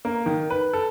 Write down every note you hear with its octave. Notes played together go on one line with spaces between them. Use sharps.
A#3
D#3
B4
A4